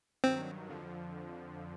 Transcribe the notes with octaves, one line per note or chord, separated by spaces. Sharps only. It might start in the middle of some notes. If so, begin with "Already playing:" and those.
G2 D#3 F#3 C4
F2 D3 F3